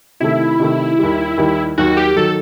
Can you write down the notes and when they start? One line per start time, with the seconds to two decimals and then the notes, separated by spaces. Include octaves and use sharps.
0.20 C3 D#3 A3 E4
0.60 C3 D#3 A3
0.99 D#2 D#3 G3
1.37 D#2 D#3 G3
1.78 D#2 D#3 F#3 F#4
1.97 G4
2.16 D#3 F#3 A4